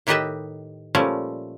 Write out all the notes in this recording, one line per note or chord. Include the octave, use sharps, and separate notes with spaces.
A2 D#3 G4 B4 D#5 E5
A#2 F3 G3 A3 C#4